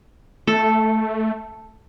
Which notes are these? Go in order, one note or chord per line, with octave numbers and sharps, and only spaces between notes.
A3 A4